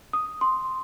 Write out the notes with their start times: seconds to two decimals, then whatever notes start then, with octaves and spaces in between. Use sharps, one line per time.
0.13 D#6
0.41 C6